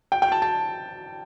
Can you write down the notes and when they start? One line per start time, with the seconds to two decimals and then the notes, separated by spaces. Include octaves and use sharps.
0.12 G5
0.22 G5
0.32 A5
0.42 A5